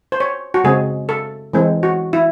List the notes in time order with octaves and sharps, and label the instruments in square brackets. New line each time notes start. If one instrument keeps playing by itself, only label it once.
[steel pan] C5
C#5
F#4
C#3 G#3 C4 G#4
A4
E3 G#3 C4
F#4
E4